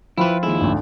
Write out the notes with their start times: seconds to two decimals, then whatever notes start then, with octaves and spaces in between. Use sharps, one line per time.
0.18 F3 E4 F4 B4 G5 B5
0.43 D#2 G#3 E4
0.61 G#1 D2